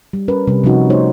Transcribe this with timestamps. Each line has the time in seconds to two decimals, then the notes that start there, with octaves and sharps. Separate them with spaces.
0.13 G3
0.28 C#4 A#4 B4
0.47 C3 G3
0.64 C3 F3 G3 C#4 D#4 F#4
0.90 A3 D#4 C5 C#5